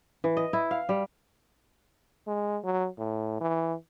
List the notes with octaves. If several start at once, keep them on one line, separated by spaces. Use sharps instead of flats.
E3
D#5
E4
F5
G3
G#3
F#3
A2
E3